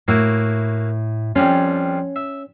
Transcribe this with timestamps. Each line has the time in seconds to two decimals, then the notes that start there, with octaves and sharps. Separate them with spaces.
0.08 A2 A#3 E4 F#4
1.36 F2 G3 C#4 F4
2.16 E5